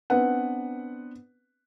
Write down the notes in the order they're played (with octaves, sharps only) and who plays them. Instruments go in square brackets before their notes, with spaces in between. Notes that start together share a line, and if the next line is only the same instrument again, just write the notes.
[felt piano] B3 C4 D4 B4 F#5